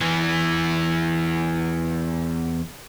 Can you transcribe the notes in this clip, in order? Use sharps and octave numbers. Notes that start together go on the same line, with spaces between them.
E2 E3